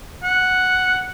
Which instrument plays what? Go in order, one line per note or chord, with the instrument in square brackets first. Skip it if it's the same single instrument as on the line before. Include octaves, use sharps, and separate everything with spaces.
[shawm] F#5